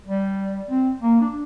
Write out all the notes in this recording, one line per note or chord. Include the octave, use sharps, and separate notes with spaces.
G3
C4
A#3
D4